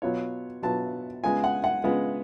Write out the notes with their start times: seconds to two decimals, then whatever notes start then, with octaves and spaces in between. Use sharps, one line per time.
0.02 B2 F#3 B3 F4 C#5
0.62 B2 F#3 B3 F4 A5
1.24 C#3 G#3 B3 F4 G#5
1.44 F#5
1.64 F#5
1.84 C#3 G#3 B3 F4